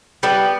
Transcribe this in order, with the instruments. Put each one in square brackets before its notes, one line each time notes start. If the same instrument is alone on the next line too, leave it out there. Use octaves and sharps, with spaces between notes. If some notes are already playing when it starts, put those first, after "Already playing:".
[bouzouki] G3 B3